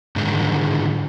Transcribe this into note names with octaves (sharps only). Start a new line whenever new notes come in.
G#2 D3 D#3 G#3